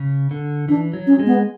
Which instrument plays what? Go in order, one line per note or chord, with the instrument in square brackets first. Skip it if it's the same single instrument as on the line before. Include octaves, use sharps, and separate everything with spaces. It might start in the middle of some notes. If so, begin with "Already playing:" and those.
Already playing: [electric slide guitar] C#3
D3
[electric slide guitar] E3 [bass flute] D4
[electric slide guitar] F#3
[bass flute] C#4
[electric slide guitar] G#3
[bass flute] B3